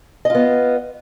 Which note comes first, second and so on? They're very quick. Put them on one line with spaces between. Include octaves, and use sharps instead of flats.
D#5 F4 B3